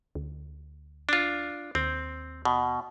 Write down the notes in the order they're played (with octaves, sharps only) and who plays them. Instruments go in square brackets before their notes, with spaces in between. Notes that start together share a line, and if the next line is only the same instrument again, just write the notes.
[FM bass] D2
[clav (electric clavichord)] D4 F4
[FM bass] D#2 [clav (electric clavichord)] C4
[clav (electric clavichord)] B2